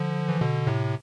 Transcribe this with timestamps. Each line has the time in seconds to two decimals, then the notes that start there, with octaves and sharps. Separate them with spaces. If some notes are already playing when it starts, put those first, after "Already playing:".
Already playing: D3 F3
0.29 E3
0.41 B2 D3
0.67 A2 C3